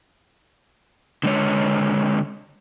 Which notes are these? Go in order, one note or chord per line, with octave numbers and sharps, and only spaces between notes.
D3 G#3 C#5